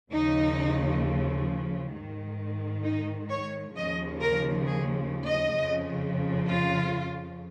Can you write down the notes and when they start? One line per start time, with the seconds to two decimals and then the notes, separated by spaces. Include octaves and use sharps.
0.11 D#2 C#3 F3 D#4
1.93 G#2 D#3
2.84 D#4
3.30 C#5
3.74 D#2 C#3 F3 D#5
4.21 A#4
4.66 G#4
5.26 D#5
5.57 F2 C#3 F3
6.47 F4